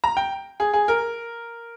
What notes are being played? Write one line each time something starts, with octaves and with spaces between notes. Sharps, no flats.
A#5
G5
G#4
G#4
A#4